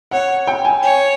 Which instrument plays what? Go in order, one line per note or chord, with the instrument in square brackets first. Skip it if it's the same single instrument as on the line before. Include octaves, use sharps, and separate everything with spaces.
[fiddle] C#5 [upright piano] F#5
[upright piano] G5
G#5
[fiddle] C#5